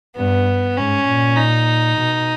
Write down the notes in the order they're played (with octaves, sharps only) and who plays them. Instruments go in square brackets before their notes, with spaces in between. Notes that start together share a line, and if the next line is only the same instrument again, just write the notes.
[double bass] G2 [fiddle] B3
[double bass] G#2 [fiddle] C#4
[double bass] A#2
[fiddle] D#4
[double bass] B2